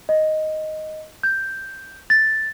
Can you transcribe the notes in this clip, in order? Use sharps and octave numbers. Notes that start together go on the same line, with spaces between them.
D#5
G6
A6